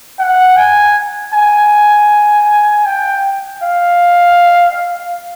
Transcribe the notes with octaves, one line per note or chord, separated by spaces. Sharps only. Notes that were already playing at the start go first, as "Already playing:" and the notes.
F#5
G#5
G#5
G5
F5